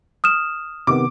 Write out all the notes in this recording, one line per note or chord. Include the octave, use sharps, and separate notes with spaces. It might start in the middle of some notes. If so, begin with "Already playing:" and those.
D#6 F6 E7
C3 D#3 B3 D6